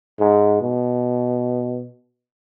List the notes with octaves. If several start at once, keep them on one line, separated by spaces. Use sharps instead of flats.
G#2
B2